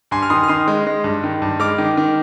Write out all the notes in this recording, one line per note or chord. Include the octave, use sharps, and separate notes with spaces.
G2 G#5 C6
F6
D#3 C6 D#6
F6
D#3 C6 D#6
G#3
G#3
G2
D#3
G2
G#3 D6 F6
D#3
D#3